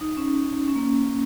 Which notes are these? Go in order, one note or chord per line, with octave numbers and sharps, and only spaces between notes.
D#4
C#4
C#4
A#3